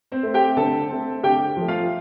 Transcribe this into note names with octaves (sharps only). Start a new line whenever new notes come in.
C4 C5
A3 C4
G4 G5
D3 A4 A5
A3 C4
D3 G4 G5
F3 A3
F4 F5